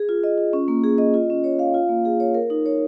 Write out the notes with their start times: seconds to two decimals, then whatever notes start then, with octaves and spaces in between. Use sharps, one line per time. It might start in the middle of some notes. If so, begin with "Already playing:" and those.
Already playing: G#4
0.09 F4
0.24 D#5
0.38 F4
0.53 C#4
0.68 A#3
0.84 G#4
0.98 D#5
1.14 F4
1.30 C#4
1.44 C#5
1.59 F5
1.74 F4
1.89 A#3
2.05 G#4
2.20 C#5
2.34 A#4
2.50 D#4
2.66 C#5